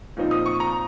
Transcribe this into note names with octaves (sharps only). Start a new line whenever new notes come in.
A#2 F3 C4 D#4
D#6
C#6
A#5